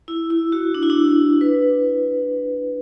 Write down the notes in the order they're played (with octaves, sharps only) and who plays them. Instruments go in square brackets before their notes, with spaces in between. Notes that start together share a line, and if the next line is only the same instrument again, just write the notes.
[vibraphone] E4
E4
F#4
D4
E4
D4
B4